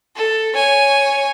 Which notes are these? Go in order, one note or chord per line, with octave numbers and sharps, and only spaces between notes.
A4
C#5 G#5